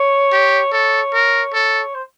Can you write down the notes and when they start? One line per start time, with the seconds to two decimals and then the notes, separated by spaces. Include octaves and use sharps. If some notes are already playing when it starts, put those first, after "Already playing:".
Already playing: C#5
0.33 G4
0.72 A4 C#5
1.14 A#4
1.54 A4 C#5
1.94 C5